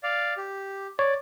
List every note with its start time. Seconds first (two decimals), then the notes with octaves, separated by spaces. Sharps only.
0.03 D5 F5
0.37 G4
0.99 C#5 D5